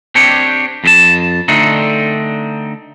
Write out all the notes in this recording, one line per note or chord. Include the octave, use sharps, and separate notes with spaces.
C4 D4 G4 C#5
F2 G4 A5
D3 A3 C4 D4 D#4